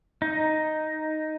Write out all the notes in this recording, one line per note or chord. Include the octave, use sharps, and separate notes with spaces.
D#4